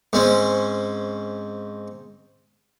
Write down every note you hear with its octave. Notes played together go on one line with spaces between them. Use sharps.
G#2 C4 C#4